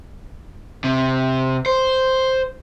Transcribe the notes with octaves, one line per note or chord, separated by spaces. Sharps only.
C3
C5